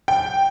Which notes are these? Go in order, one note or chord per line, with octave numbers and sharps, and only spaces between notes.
G5